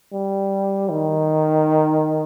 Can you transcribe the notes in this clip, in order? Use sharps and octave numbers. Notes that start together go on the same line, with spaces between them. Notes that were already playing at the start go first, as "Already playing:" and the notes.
G3
D#3